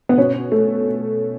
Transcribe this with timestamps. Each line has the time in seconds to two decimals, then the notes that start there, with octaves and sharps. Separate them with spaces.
0.09 B3
0.18 B2 C#4
0.52 A3